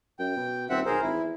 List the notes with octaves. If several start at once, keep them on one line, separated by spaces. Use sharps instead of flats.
F#2 G5
B2
D#1 C4 E5 F#5
B1 G#4 A#4 C5
G#1 E4
E2